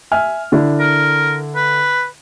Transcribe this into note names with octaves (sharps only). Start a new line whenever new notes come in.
E5 G#5 F6
D3 D4 E4
A#4
B4